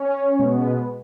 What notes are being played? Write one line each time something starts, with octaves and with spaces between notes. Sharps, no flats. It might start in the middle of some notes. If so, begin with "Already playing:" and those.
Already playing: C#4 C#5
B2 G#3 B3